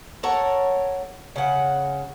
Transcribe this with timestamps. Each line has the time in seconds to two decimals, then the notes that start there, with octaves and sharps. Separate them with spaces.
0.23 A4 A#4 C#5 F#5
1.36 C#3 F#5